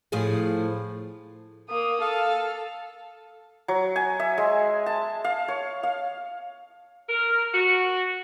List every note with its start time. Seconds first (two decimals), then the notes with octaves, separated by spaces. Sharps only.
0.12 A2 F3 G#4
1.69 A#3 D#6
2.01 A4 F5
3.68 F#3
3.96 G#5
4.20 E5
4.38 G#3
4.86 A5
5.24 F5
5.48 C#5
5.83 F5
7.09 A#4
7.54 F#4